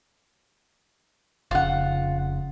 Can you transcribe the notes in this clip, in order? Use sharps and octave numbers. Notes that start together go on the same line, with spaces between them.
F1 C#3 F4 F#5